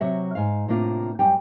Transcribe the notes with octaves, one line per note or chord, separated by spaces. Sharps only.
C3 F#3 F#4 E5
G#2 F5
A2 C3 A#3 D4 F4
F#2 G3 G5